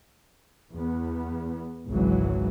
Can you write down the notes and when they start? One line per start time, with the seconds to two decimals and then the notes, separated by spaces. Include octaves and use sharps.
0.72 E2 B3
1.89 G#1 C#2 E3 F#3